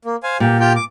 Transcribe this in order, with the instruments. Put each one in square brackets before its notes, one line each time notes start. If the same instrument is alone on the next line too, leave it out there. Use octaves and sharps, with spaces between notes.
[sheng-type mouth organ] A#3
C5 F5 G#5
[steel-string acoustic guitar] A#2 [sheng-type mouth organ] G4
[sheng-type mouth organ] F4 G4 G5
D6